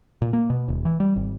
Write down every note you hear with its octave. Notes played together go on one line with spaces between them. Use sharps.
A#2
A#3
B2
D#1
E3
G3
G#1